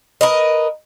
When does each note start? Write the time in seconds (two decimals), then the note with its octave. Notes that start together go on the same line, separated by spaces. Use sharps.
0.21 A#4 B4 D#5